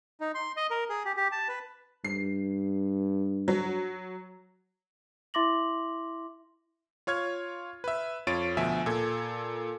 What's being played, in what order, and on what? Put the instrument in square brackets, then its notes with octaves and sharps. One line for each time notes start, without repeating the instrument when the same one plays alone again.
[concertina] D#4
C6
D#5
A#4
G#4
G4
G4
A5
B4
[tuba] G2 [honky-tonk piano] C7
[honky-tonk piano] F#3
[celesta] E4 E5 C6 D6 A#6 F#7
[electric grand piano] F4 C#5 F6 G#6
B4 E5
F2 F4 C#5 A6 D7 D#7
D2 B2 F3 E5 G#5
A#2 A4 G#6